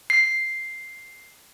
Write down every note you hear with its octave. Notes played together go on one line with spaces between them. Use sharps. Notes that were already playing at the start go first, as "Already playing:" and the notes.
C7